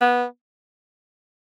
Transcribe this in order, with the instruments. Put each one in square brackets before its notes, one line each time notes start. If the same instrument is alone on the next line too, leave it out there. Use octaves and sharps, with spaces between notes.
[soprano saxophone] B3